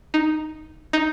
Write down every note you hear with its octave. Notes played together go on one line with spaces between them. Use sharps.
D#4
D#4